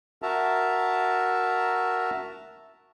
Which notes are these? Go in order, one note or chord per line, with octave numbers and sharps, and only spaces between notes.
F#4 A#4 E5 A5 A#5